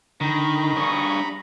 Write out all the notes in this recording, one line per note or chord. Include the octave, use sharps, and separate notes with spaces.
D3 D#3 A#5 B5
G2 G#4 C#6